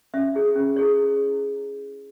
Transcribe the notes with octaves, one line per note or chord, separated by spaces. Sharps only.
C#4 E5
E4 G#4 C#5
C#4
E4 G#4 C#5